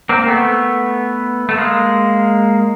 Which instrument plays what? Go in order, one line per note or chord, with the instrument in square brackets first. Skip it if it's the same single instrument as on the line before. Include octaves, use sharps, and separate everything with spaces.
[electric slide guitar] A#3 C4
A3 B3
A3
G#3 A#3